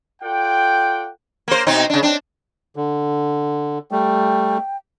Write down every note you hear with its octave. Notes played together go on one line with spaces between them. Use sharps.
F4 A4 D5 F#5 G5
A#3 C5
B2 C4 D#4
C#3 D4
C4 D4
D3
G3 A3 G5